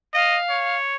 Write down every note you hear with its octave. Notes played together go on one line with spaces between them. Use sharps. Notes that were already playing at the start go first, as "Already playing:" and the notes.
D#5 F5
C#5